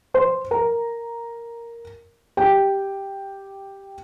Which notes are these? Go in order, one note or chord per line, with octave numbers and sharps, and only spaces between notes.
C5 C6
A#4 A#5
G4 G5